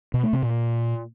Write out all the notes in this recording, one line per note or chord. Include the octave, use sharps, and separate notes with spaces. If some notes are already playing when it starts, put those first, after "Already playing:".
B2
A3
C3
A#2